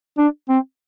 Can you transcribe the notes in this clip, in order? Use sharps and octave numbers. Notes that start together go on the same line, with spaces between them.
D4
C4